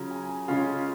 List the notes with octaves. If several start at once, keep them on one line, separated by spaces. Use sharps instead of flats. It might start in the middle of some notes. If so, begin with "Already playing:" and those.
Already playing: C#3 F#3 C#4 F4 A#5
G#5
C#3 G#3 C#4 F4 F5